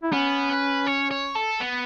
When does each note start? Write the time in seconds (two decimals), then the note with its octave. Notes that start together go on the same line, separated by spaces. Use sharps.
0.03 E4
0.13 B3 C#4
0.49 B4
0.87 C#5
1.11 C#5
1.35 A4
1.61 B3